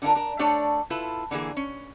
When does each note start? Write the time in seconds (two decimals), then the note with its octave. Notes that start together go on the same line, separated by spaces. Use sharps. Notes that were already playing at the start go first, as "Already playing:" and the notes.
0.02 D3 D4 D#4 F4 A#4
0.15 D4 A#4
0.39 A3 D4 A4 C#5 D5
0.90 E4 F4 A4 B4
1.31 D3 E3 A#3 G#4
1.57 C#4